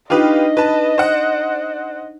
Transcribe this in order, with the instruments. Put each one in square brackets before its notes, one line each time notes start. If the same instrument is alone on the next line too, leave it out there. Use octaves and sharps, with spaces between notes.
[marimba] D4 D#4 [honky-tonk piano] F4 G4 B4 [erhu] D#5
[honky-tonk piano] B4 A5
C5 F#5